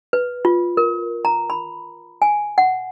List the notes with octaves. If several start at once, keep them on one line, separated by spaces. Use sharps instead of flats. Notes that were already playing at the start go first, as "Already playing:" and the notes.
B4
F4
A#4
A#5
B5
G#5
F#5